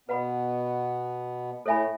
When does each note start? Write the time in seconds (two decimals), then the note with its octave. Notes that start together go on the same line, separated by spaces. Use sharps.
0.08 B2 B3 B4 F#5 B5
1.66 A2 A3 A4 C#5 E5 G#5 B5